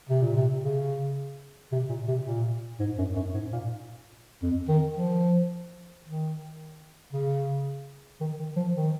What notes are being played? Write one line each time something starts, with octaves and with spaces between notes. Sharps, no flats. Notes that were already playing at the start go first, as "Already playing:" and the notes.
C3
A#2
C3
C#3
C3
A#2
C3
A#2
G#2
F#2
F#2
G#2
A#2
F2
D#3
F3
D#3
C#3
D#3
D#3
F3
D#3